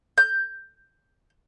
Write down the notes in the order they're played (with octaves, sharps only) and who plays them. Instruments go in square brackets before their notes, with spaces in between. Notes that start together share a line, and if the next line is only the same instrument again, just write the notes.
[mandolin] G6